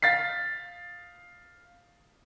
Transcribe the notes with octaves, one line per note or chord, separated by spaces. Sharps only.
F5 A6 B6 C7